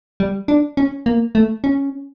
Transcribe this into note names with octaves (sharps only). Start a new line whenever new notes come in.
G3
D4
C#4
A#3
A3
C#4